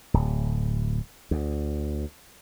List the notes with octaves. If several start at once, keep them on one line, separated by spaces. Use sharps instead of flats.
D1
D2